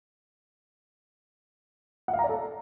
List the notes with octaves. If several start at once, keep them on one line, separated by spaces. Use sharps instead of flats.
F#5
F5
A#5
D5
A4